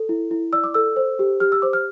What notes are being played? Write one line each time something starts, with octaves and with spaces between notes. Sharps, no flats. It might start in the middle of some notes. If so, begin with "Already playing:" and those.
Already playing: A4
E4
E4
D5 E6
D6
A4 E6
C5
G4
G4 F6
E6
C5 D6
F6